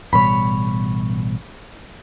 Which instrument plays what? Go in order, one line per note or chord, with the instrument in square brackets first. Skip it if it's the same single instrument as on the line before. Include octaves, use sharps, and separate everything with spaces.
[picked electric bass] A1 B2 G3 [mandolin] C#5 B5